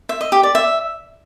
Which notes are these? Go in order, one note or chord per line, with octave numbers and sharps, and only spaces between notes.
E5
D#5
G4
D5
E5